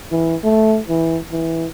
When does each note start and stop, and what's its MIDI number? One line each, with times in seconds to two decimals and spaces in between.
0.11 0.36 52
0.43 0.79 57
0.88 1.18 52
1.31 1.66 52